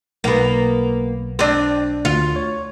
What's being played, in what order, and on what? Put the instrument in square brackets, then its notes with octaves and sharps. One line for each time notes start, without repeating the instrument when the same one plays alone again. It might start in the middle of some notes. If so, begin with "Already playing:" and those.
[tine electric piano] B1 [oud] A#3 B3
[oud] C4 D4
[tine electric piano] D2 [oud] F4
[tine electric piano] C#5